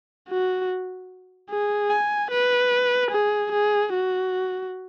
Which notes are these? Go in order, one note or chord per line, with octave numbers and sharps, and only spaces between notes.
F#4
G#4
G#5
B4
G#4
G#4
F#4